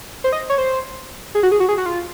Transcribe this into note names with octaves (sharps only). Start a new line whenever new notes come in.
C5
D#5
C#5
C5
G#4
F#4
G#4
F#4
G#4
F#4
F4